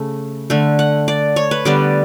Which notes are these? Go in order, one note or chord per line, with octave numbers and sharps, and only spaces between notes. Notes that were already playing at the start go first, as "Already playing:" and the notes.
Already playing: C#3 A3
D3 A3
F#5
D5
C#5
B4
D3 G3 B3 D5